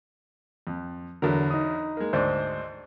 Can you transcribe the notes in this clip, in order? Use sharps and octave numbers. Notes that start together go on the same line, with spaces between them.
F2
E2 D3 F#3 A#4
D#4 D#6
G#3 A#3
D2 G#2 C5 D5 D#5